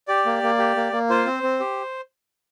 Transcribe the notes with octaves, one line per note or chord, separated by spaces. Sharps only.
G4 D5
A#3
A#3
G4
A#3
A#3
F4 C5
C4
C4
G4